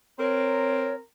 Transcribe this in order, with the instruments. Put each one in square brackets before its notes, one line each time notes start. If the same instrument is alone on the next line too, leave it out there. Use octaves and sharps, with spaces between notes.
[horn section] C4 A#4 A#5 [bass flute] C#5